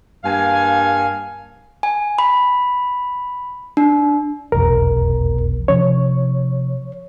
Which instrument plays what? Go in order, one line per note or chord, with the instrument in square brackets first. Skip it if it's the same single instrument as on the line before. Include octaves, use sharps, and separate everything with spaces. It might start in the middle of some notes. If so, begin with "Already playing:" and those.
[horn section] G2 A#3 F5 G#5
[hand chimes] G#5
B5
D4
[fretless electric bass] F1 B1 E2 [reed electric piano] A#4
[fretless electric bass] C3 F3 C#4 [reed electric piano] C#5